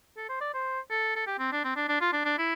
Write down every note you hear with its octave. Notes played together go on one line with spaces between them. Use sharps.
A4
C5
D5
C5
A4
A4
G4
C4
D4
C4
D4
D4
F4
D4
D4
E4